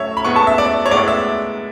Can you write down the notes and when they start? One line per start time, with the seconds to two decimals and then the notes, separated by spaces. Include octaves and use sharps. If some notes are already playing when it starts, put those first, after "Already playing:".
Already playing: A2 F#3 A3 C#5 E5
0.17 B5
0.25 A2 G#3 B3 C#6
0.36 A5
0.47 E5
0.58 D5
0.86 C#5
0.91 A2 G#3 B3 D5
1.08 E5